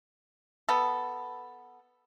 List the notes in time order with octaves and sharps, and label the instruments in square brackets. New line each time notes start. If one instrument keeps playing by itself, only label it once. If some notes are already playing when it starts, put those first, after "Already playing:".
[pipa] B3 A4